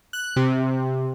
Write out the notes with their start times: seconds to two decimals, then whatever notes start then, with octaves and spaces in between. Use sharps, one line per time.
0.13 F#6
0.36 C3